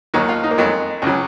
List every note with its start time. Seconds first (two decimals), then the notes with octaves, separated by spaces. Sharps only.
0.14 D#2 D#3 F#3 D#4
0.29 F4
0.44 D#4
0.51 A#3
0.58 F2 D#3 F#3 G#3
1.02 C#2 C#3 F#3